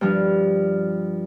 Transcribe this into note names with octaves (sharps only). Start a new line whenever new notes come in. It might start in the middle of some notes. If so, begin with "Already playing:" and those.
G2 F3 D4